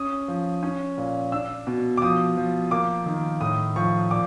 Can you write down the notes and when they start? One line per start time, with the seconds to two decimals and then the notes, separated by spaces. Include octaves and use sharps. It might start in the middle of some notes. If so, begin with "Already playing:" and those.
Already playing: C#4 D#6
0.28 F3
0.63 C#4
0.98 A#2
1.32 D4 E6
1.67 B2
1.97 D6
2.02 F3 D#6
2.37 F3
2.71 A#3 D6
3.06 D#3
3.41 A2 D#6
3.76 F3 C#6
4.11 A#2 D6